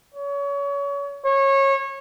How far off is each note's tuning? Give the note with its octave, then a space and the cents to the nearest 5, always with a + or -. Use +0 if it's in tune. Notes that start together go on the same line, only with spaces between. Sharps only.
C#5 +30
C#5 -25